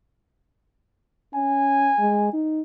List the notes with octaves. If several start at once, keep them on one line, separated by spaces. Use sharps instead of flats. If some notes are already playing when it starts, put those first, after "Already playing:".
C#4 G#5
G#3
D#4